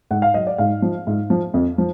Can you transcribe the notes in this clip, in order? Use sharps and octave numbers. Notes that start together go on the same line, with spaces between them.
G#2 F#5
F5
F#3 D#5
D5
G#2 F5
F3
G#2
F3
F2
F3